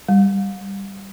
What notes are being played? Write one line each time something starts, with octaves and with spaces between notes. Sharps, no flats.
G3